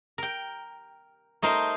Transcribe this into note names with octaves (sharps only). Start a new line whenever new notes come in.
A#4 G5
A3 D#4 A#4 C5